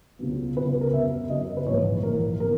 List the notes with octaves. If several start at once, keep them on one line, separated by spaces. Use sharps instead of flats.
C#2 C#3 F#3 B3
C#2 C#3 F#3 B3 B4
A#4
F#2 C#3 F#3 B3 E5
F#2 C#3 F#3 B3 D#5
B4
A#1 G#2 E3 C#5
A#1 G#2 E3 A#4
E3 B3 A#4